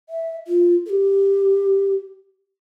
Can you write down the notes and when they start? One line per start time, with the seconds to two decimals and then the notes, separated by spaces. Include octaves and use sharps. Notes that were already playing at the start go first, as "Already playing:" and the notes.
0.09 E5
0.47 F4
0.86 A4
0.89 G4